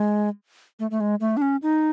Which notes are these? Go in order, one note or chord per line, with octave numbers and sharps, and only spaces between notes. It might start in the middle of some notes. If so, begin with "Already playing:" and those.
Already playing: G#3
A3
A3
G#3
A3
D4
C#4
D#4